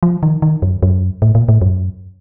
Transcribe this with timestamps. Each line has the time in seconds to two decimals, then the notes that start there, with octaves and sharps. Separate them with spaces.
0.03 F3
0.23 D#3
0.42 D#3
0.62 F#2
0.83 F#2
1.22 A2
1.35 A#2
1.49 A2
1.61 F#2